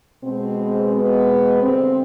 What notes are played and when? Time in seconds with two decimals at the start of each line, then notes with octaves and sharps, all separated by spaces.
0.23 B2 G#3 C4
0.93 B3
1.62 G2 D3 G3 C4